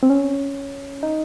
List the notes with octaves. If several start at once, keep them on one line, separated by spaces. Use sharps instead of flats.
C4
C#4
D#4